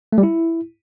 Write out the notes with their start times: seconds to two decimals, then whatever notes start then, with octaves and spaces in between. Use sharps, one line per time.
0.12 A3
0.18 G3
0.23 E4